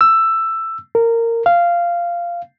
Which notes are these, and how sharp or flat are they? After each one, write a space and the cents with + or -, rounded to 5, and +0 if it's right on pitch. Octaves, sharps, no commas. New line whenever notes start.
E6 +10
A#4 -20
F5 -10